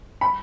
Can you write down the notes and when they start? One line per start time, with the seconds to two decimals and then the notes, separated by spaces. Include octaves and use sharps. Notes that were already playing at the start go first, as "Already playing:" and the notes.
0.21 B5